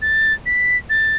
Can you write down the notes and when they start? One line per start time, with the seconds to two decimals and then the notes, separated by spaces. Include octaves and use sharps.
0.02 A6
0.46 B6
0.90 A6